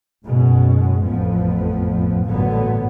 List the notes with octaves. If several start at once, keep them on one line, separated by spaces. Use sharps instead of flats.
F#1 B2 G#3 C#4
A1 F2 F3 B3
A1 G2 A#2 D3 F#3 B3